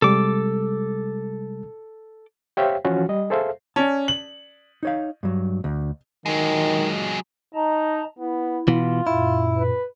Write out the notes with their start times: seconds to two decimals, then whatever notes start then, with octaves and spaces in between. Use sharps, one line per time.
0.02 C3 G3 G#3 A4 D6
2.57 G4 C5 C#5 E5 F5 G5
2.84 E3 F3 C#4 F4 F#4 C#5
3.09 G3 D#5
3.30 G#4 A4 C5 E5 F5
3.76 C#4 D5 A5
4.08 F#7
4.83 D#4 C#5 F5
5.23 G2 F#3
5.64 D2
6.26 D#3 F#3 G#3
7.54 D#4 D#5 A5 A#5
8.19 B3 E4
8.68 B2 E3 F4
9.07 F#2 A#2 E4
9.58 B4